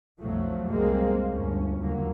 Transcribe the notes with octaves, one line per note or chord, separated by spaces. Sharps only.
B1 F2 F3 F#3 A3
C2 G#3 A#3 C4
G1 D2 C#4
D#2 D3 F#3 A#3